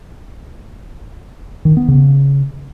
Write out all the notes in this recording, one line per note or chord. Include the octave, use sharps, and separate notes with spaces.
D#3
B3
C#3